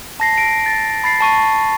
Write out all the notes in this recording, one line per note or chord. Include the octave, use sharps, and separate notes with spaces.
A5 A#6 C7
D7
A6
B5 A6 C7
A5 C#6 D#7